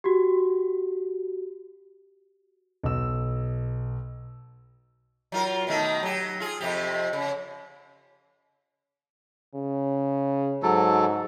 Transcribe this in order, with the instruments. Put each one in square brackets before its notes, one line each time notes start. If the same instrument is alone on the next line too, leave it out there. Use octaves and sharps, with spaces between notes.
[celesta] F#4 G4
[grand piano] B1 E6
[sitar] F#3 F4 A#4
B2 D#3 A3
F#3 G4
F4 G#4
F2 C3 G4
C#3
[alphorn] C#3
[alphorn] G#2 [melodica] F#3 A4